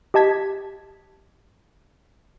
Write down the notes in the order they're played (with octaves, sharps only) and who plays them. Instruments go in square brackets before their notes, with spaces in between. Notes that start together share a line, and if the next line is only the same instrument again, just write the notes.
[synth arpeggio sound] G4 D#5 A5 G#6 B6